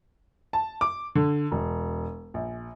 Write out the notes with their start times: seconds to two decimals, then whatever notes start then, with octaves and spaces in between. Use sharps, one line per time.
0.53 A5
0.81 D6
1.15 D3
1.52 E1
2.34 A#1